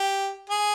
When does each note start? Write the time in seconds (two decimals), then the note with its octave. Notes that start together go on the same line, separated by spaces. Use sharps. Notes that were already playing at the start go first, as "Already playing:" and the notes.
Already playing: G4
0.50 G#4